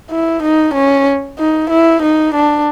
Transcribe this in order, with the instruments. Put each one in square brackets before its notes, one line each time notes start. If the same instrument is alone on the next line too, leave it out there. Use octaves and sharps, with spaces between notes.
[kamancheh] E4
D#4
C#4
D#4
E4
D#4
D4